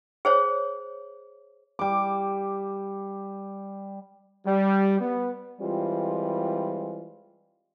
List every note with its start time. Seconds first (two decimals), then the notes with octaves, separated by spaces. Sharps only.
0.25 G#4 C5 C#5
1.79 G3 D6
4.46 G3
5.00 B3
5.61 E3 G3 G#3 C4 F4